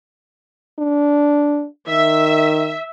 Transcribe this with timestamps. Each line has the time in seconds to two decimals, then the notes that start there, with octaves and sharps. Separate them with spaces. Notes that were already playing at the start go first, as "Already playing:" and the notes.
0.79 D4
1.88 D#3 E5